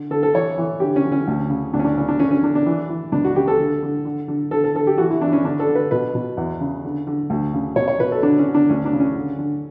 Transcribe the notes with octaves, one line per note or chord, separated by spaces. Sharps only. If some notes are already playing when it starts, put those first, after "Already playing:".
Already playing: D3
D3 A4
A4
E3 C#5
E3
D3 G4
C#4
D3
C#4
D2
C#3
D2 D4
C#4
D4
C#3 C#4
D4
D3 C#4
C#4
D3 D4
D4
E3
E3
C#2 D4
F#4
C#3 G4
A4
D3
D3
D3
D3
D3 A4
A4
D3 A4
G4
E3 F#4
E4
E3 D4
C#4
D3 D4
A4
D3
B4
B2 B4
B2
E2
C#3
D3
D3
D2
C#3
B2 C#5
C#5
B2 B4
A4
D3 D4
C#4
D3
D4
D2 C#4
D4
C#3
C#4
D3
D3